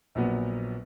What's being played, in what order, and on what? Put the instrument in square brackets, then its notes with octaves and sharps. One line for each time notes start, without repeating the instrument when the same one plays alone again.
[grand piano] A#1 A#2 F#3 B3